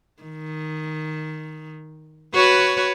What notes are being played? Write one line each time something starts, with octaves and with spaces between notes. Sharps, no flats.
D#3
F#4 B4 C#5